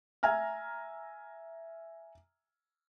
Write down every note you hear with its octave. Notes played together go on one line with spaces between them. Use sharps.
E5 G#5 A#5 F6